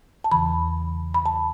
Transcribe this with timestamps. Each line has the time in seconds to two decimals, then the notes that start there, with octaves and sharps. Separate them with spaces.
0.24 A5
0.32 E2 C#3 E3 B5
1.14 B5
1.26 A5